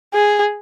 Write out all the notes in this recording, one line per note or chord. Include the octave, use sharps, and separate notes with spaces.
G#4